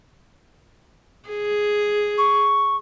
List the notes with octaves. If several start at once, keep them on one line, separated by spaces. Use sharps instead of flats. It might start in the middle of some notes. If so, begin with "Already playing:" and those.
G#4
C#6